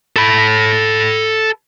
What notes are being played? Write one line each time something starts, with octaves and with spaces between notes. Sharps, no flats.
A4 B5